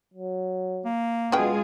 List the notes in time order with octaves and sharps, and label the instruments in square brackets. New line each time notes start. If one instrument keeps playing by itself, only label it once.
[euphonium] F#3
[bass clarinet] A#3
[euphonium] B2 [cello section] G#3 F4 G#4 [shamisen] C#4 B4 G5